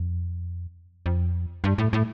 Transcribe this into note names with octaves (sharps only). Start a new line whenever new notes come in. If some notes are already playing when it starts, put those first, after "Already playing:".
Already playing: F2
F2
G2
A2
A2